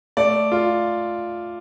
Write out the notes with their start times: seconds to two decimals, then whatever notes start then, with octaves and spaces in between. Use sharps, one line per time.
0.17 A3 D5
0.52 F4